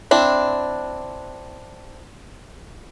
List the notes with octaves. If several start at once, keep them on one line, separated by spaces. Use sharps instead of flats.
C4 D4 E4